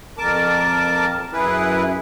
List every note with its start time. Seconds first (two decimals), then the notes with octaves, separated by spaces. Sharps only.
0.18 F2 A#4 A5 D6
1.33 F#2 E4 G#4 B4